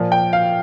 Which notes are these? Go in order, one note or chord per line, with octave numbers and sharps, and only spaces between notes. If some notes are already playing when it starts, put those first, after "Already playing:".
Already playing: A#2 F3
G5
F5